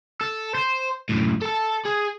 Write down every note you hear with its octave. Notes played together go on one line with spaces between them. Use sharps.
A4
C5
F#2 A2
A4 A5
G#4